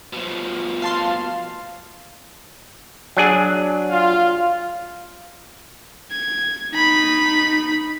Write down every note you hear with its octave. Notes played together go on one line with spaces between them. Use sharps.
B2 F3
F5 A5 C6
F#3 D4 G#4
F4 F5
G#6
D#4 B5